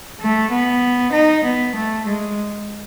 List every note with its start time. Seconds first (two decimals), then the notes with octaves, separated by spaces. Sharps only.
0.21 A3
0.50 B3
1.12 D#4
1.44 B3
1.75 A3
2.05 G#3